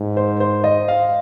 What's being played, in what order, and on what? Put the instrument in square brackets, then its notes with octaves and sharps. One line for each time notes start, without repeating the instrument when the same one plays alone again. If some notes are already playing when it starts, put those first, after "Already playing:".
Already playing: [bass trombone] G#2
[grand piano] C5
C5
D#5
F5